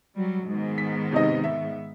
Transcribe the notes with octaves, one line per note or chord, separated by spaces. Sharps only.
F#3 G3
G#2 D#3 B3
B6
C3 D#4 D#5
E5